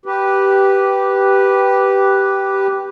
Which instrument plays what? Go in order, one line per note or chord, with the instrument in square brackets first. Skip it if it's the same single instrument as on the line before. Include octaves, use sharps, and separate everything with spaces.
[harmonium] G4 B4